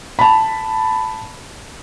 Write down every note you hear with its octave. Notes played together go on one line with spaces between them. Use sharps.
A5 B5